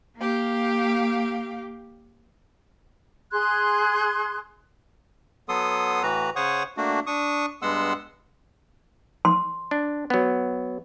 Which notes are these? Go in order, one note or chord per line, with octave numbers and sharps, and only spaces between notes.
A#3 G4 F5
G#4 C6 F#6 G#6
F#3 B3 A4 C6 D#6
A2 E3 F#4 B4 A#5
C#3 C5 C#5 F#5 C#6 D#6
A3 A#3 D4 F#4
D4 C#6 D#6
G2 G#3 B3 F#5 C6 E6
C6
D4
F#3 B3